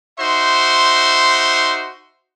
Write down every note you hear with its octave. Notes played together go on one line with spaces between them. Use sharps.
D#4 F#4 C5 E5 C6